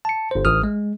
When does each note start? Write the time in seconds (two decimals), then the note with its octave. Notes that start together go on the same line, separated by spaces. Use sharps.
0.05 A5 C#7
0.31 G1 C5
0.45 A1 D#6 F6
0.64 G#3